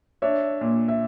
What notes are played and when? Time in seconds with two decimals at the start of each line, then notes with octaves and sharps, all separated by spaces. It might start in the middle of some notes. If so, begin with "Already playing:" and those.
0.22 D4 C#5 E5
0.61 A#2
0.88 E5